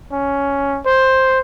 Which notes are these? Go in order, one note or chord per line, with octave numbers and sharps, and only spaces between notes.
C#4
C5